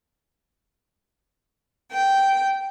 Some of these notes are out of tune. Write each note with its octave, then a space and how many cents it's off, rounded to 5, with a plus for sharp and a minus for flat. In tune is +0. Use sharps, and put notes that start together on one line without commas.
G5 -10